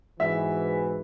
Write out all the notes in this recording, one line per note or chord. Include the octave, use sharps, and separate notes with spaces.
G#2 B2 E3 E5